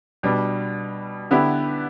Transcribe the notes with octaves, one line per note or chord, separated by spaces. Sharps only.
B2 G3 D4
D3 B3 E4 G4